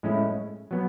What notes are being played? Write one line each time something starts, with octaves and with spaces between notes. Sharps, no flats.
A2 G#3 C#4 E4
F#3 B3